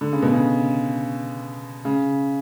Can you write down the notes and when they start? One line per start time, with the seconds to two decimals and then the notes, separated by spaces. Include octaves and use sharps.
0.01 D3
0.13 C#3
0.22 B2
0.33 C#3
1.85 C#3